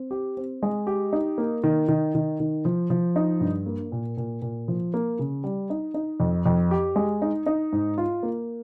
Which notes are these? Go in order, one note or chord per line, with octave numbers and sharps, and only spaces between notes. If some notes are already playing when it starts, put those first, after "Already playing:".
Already playing: C4
G4
C4
G#3
G4
D#4
A#3
D#3
D#3
D#3
D#3
F3
F3
D#4
G2
A#3
A#2
A#2
A#2
F3
A#3
C#3
G3
D#4
D#4
F2
F2
G4
G#3
D#4
D#4
G#2
F4
A#3